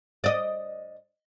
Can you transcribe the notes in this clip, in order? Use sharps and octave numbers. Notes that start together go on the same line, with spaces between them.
D5 D#5